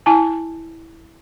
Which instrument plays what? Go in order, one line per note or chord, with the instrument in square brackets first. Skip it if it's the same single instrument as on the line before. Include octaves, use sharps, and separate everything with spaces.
[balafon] E4 G#5 A5